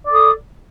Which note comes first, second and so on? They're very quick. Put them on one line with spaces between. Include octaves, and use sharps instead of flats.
D5 A4 D#6